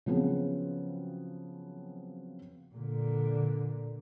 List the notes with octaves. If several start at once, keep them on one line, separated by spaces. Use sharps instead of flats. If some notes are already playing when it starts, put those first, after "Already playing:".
C#3 F3 F#3 B3 C4 G#4
A#2 D3